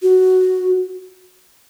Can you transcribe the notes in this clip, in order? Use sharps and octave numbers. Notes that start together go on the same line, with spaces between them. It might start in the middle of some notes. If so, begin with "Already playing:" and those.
F#4